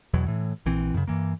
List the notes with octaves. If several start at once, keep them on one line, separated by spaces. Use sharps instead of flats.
E2 B2 E3 F#3
A2 E3
A#1 E3 C4
F#2 C#3
G2 E3 A#3